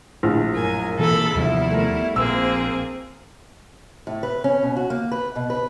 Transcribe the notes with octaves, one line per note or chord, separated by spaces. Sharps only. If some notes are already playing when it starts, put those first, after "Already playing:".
A#1 A2
F#2 A#4 G#5
B2 E3 A#3 A4 B5
D#2 C3 F3 G3 B3 E4
A3 A#4
A#1 A#3 C4 G#4 C5 E6
A2
B4
C#4
B2
F#4
A#3
B4
B2
B4